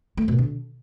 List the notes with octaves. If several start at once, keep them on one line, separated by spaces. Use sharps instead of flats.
A3
B2
D3